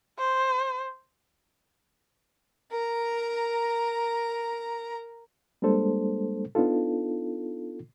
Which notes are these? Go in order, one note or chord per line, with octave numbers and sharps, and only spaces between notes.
C5
A#4 A#5
G3 G#3 A#3 D4 A4 C5
B3 D4 D#4 F4 A4